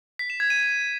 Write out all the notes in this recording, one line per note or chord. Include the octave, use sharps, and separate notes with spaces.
B6
E7
G#6
D#7